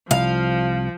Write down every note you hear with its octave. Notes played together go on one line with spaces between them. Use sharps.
C2 F3 F5